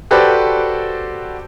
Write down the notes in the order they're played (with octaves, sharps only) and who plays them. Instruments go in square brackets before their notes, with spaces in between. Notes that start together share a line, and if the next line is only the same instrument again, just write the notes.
[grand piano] F#4 G4 A4 B4 C5 D5